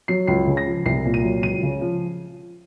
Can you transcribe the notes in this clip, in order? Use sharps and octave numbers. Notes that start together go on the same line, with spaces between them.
F#3 C7
C#2 C7
C#3
A#6
F3
C2 C7
A#2
D#7
F#3
C#2 D#7
C#3
F3